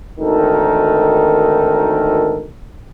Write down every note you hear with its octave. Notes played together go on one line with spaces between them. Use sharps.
G#1 D2 D#3 D#4 A4 A#4